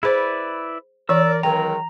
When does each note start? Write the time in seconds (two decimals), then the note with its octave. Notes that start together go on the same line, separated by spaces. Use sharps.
0.03 E4 G#4 B4 C5 D5
1.09 E3 A#4 C#5 D5 E6
1.43 C#2 D#3 F#3 G5 A#5